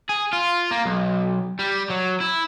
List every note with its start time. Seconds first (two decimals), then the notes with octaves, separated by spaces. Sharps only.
0.09 G#4
0.33 F4
0.71 A#3
0.85 B1
1.59 G3
1.90 F#3
2.20 E4